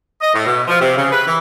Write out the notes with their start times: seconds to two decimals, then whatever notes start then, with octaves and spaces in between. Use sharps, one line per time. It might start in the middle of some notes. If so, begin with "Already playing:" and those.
0.21 D#5
0.33 A2
0.46 B2
0.68 F3
0.79 C3
0.95 C#3
1.11 B4
1.26 E3